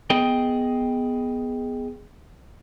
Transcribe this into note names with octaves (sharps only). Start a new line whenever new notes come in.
B3 G#4 D#5 G5